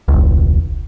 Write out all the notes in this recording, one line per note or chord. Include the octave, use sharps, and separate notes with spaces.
E1 C#2